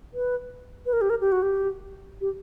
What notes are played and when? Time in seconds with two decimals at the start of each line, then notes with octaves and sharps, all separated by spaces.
0.14 B4
0.86 B4
0.93 A#4
1.01 G4
1.10 A#4
1.21 G4
1.32 F#4
1.42 G4
2.21 G4